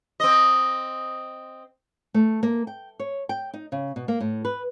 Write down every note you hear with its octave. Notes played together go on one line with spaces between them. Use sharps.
C4 D#5
A3
A#3
G5
C#5
G5
D#4
C#3
B2
A#3
A2
B4